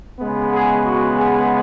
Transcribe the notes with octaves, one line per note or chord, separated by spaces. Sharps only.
C#3 G#3 B3
G#4
F#4
G#4